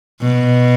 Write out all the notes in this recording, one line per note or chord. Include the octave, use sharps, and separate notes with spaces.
B2